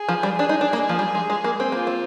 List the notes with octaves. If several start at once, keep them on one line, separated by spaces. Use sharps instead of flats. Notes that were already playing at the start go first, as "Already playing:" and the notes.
Already playing: G#4
F3
G3
D4 G#4
D#4
D4
A#3
F3
G3
G#3
G#3
A#3
C4
A#3 F4
C4